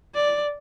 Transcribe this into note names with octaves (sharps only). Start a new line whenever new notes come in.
D5